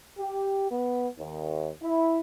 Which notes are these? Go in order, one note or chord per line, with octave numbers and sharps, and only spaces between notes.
G4
B3
D#2
E4